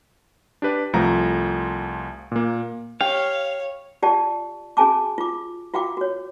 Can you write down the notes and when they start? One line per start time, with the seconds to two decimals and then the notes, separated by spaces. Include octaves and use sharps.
0.62 D4 G4 B4 D5
0.93 C2 F3 A3 A#5
2.32 A#2 A#3
3.01 G4 C#5 F5
4.02 F4 G4 D5 G5 A5
4.77 C#4 F#4 G#4 G#5 A5 D6
5.18 F4 D6
5.74 F4 F#4 F5 G5 D6
5.97 F#4 C#5